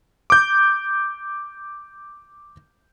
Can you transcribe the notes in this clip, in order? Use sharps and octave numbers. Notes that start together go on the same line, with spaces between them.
D6 G6